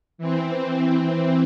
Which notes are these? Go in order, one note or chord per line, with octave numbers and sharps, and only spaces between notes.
E3 C4